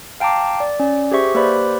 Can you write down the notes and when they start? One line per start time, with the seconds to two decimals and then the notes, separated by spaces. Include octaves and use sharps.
0.20 F5 G5 A5 A#5 D6
0.60 D5
0.80 C#4 D5
1.11 G4 G#4 C5 E5 C#6
1.35 A#3 G4 B4 C5 D5 B5